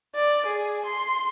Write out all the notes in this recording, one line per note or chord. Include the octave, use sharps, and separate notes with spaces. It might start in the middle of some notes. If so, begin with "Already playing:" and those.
D5
G#4
C6